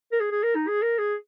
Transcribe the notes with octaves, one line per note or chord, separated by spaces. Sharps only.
A#4
G#4
G#4
A#4
D#4
G#4
A#4
G#4